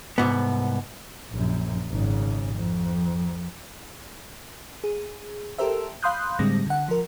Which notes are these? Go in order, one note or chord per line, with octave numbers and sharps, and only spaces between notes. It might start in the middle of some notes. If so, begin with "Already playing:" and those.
C2 G#2 B3
A#1 F#2
G#1 C#3
F2
G#4
G4 A4 A#4 C5 E5
F5 B5 C6 D#6 F#6 G6
A2 D3 G3 G#3 C4 A#6
D3 F#5
F3 A#4